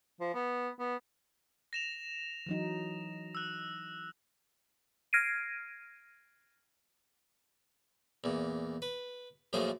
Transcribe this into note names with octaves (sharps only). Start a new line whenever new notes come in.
F3
B3
B3
A#6 E7 F7
E3 F#3 D#4
E6 F#6
F6 G#6 A#6 C7 D7 D#7
E2 A#2
B4
F#2 A#2 F3 A3 G#4 C5